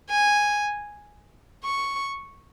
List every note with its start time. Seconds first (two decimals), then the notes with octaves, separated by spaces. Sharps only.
0.10 G#5
1.64 C#6